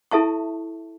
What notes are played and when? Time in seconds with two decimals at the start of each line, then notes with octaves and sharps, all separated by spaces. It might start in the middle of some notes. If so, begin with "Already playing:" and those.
0.11 E4 A4 E5 A5 C#6